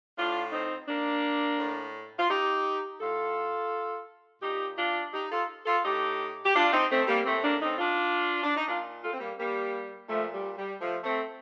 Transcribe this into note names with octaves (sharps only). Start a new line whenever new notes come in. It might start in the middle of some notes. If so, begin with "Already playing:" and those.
A2 D4 F4
C4 D#4
A#3 D4
A2
F4
D#4 G4
A2 F4 A4
A#2 D#4 G4
D4 F4
D#4 G4
F4 A4
F4 A4
A2 D#4 G4
G4
D4 F4
C4 D#4
A3 C4
G3 A#3
A2 A3 C4
A#3 D4
C4 D#4
D4 F4
D4
D#4
A#2 D4 F4
F4 A4
C4
G3 A#3
G3 A#3
A#2 F3 A3
G3
G3
F3 A3
A3 C4